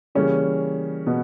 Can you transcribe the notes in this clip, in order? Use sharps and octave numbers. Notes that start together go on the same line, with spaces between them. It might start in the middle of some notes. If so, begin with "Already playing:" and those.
C#3 E3 G3 A#3 C#4
B2 B3